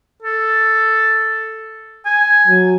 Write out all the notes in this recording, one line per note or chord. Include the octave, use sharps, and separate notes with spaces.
A4
G#5
F#3